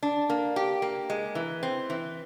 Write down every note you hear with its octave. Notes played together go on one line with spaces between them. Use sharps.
D4
A#3
G4
A#3
G#3
E3
C4
E3